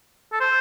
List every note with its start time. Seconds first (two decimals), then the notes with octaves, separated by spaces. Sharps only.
0.33 A4
0.41 C5